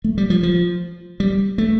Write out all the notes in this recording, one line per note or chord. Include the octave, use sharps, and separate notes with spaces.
A3
G3
F3
F3
G3
A3